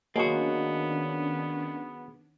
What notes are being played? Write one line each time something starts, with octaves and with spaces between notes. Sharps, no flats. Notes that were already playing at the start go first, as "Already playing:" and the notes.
D#3 F#3 G#3 A#3 B3 C#4 D4 F#4